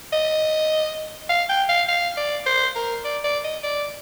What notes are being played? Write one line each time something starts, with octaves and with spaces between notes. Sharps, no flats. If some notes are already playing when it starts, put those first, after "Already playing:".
D#5
F5
G5
F5
F5
D5
C5
A#4
D5
D5
D#5
D5